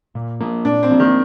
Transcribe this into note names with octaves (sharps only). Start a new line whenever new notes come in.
A#2
F3 A#3
A#2 D4
C4
F3 A#3
D#3